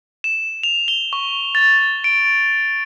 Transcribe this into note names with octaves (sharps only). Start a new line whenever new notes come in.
E7
F7
G7
C#6
A6
D7